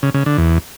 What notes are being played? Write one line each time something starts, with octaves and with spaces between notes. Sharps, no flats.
C#3
C#3
D3
E2